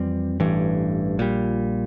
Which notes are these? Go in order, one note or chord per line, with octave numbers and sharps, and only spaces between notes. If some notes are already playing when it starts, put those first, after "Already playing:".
Already playing: F2 E3 G3 C4
A1 G2 E3
A#1 A#2 G3